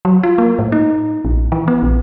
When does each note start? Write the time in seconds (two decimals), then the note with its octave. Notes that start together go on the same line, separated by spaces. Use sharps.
0.05 F#3
0.23 F4
0.38 A#3
0.59 A2
0.72 D#4
1.25 A#1
1.52 E3
1.68 B3
1.82 A#1